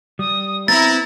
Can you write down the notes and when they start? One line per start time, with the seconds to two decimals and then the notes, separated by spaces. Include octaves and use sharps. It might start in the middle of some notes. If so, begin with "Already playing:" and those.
0.19 G3 D#6
0.68 B3 C4 E4 A#5 A6